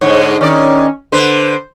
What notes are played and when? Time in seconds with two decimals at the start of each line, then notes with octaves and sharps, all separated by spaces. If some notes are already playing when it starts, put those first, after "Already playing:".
0.01 G#2 D3 G#3 C#5
0.41 D#3 C#4 D5
1.12 D3 B4 C5